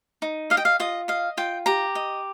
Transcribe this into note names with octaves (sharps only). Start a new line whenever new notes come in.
D#4
D#5 F5
G5
F5
F4 D#5
D#5 F5
F4 G5
G4 A#5
D#5